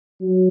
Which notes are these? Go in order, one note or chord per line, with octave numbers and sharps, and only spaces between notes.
F#3